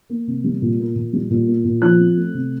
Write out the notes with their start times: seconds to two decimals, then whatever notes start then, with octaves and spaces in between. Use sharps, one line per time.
0.10 A#3
0.27 C3
0.44 G3
0.62 A#2
0.79 A#3
0.96 A#2
1.13 G3
1.30 A#2
1.48 A#3
1.65 A#2
1.82 F3 F#6
1.99 C4
2.17 A3
2.34 C3